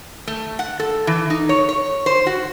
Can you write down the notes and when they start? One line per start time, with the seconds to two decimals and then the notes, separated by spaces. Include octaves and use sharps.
0.27 A3
0.59 F#5
0.79 A4
1.07 E3
1.30 D#4
1.49 C#5
1.69 C#5
2.06 C5
2.26 F#4